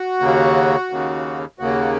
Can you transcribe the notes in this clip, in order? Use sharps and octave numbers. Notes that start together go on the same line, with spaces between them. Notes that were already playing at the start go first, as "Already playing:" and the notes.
Already playing: F#4
D#2 C#3 A#3
D#2 C#3 A#3
D#2 C#3 A#3 F#4